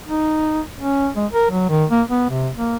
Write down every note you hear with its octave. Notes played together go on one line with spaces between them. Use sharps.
D#4
C#4
G#3
A#4
F#3
D#3
A#3
B3
C3
A#3